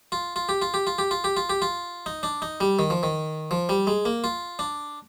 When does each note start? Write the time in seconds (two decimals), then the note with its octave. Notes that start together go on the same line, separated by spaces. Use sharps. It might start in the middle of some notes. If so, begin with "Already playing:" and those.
0.12 F4
0.36 F4
0.49 G4
0.62 F4
0.74 G4
0.87 F4
0.98 G4
1.11 F4
1.24 G4
1.37 F4
1.49 G4
1.62 F4
2.06 D#4
2.23 D4
2.42 D#4
2.60 G3
2.79 D#3
2.90 F3
3.03 D#3
3.51 F3
3.69 G3
3.87 G#3
4.05 A#3
4.24 F4
4.59 D4